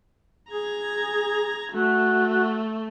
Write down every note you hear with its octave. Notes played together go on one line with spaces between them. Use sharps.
G#4 A#5 G#6
A3 F#4